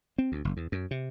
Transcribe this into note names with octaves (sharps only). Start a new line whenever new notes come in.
C4
D2
F#1
E2
F#2
C3